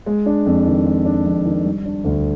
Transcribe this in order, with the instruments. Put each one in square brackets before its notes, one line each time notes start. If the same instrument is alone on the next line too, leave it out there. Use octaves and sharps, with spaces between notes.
[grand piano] G#3
D4
F2
D#3
G#3
D4
F2
D#3
G3
D4
D2